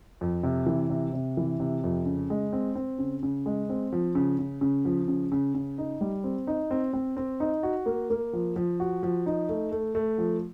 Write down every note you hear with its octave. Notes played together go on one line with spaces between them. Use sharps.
F2
C3
E3
C3
C3
E3
C3
F2
C#3
G#3
C4
C4
C#3
C#3
G#3
C4
F3
C#3
C#3
C#3
F3
C#3
C#3
C#3
D#4
G3
C4
D#4
C4
C4
C4
D#4
F#4
A#3
A#3
F3
F3
F#4
F3
D#4
A3
A3
A3
F3